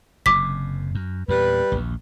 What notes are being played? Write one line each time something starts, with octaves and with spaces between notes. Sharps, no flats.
F#1 F#2 C3 D6 B6
F#2
E2 A#2 G3 B4
A#1 D#2